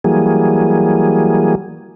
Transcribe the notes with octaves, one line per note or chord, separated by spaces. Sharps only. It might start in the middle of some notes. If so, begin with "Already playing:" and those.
E3 F#3 G3 A#3 G#4